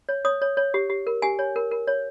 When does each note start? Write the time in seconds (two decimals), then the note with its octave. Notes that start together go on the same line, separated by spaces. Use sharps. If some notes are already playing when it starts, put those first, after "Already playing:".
0.09 C#5
0.25 C#5 D#6
0.42 C#5
0.57 C#5
0.74 G4
0.90 G4
1.07 A#4
1.22 G4 G#5
1.39 C#5
1.56 A#4
1.71 A#4
1.87 C#5